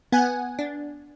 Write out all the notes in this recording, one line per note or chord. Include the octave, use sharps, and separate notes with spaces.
B3 F#5 G#5
D4